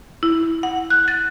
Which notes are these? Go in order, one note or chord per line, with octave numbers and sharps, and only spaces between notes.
E4
F#5
F#6
A6